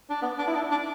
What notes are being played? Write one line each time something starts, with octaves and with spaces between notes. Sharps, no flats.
D4
B3
D4
E4
D4
D4